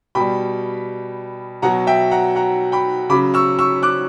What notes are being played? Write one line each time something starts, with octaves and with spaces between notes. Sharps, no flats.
B2 G3 G5 B5
B2 F#3 F#5 A#5
E5 G5
F#5 A#5
F#5 A#5
G5 B5
C#3 F#3 B5 D6
C#6 E6
C#6 E6
D6 F#6